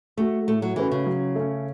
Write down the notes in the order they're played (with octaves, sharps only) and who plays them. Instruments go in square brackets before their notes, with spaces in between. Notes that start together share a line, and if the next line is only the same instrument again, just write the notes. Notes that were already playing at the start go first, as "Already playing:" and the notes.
[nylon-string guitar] A3 [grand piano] F#4 A4
[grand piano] A2 [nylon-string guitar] A3
[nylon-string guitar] F#3
[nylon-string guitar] E3 [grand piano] A3 C#4 F#4 B4
[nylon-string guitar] C#3
[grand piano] F#3
A3 C#4